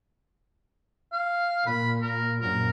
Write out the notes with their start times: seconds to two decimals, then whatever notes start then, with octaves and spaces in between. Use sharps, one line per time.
1.12 F5
1.66 A#2 B5
2.02 A#4
2.41 A#1 F#2 A#2 A#4